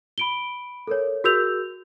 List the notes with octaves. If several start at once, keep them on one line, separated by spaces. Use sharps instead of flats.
B5 D7 G7
A4 A#4 C#5
F#4 G#4 A#4 E6 G6 F7